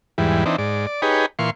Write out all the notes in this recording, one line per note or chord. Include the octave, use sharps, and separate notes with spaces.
E2 G#2 E3 G3
E3 C4 D4 D#4
G#2 D5
D5
D#4 G4 G#4 B4 C#5
A#2 E3 F5 C6 C#6